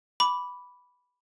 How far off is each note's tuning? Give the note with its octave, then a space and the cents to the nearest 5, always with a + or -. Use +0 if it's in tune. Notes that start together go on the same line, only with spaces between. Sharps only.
B5 +0 D6 -15